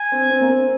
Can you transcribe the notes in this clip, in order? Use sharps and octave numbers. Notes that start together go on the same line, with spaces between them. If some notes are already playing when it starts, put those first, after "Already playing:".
Already playing: G#5
C4
C4
A#3
C4